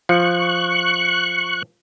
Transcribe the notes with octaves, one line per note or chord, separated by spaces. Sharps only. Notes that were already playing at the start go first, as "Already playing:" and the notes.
F3 C#6 F#6